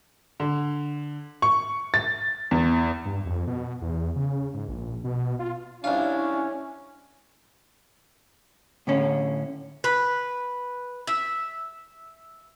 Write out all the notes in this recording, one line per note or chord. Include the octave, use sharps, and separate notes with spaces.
D3
C#6
A6
E2
G2
F2
B2
E2
C#3
G#2
A#1
B2
F4
C2 C#4 D4 E4 F4
A2 D3 C#4
B4
E5